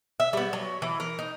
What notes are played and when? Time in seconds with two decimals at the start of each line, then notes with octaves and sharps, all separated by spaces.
0.20 E5
0.33 G3 B3
0.53 F#3
0.82 E3
1.00 A#4
1.19 D#4